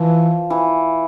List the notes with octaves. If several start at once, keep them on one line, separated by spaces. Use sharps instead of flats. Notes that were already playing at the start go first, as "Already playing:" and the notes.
Already playing: E3 F3
E3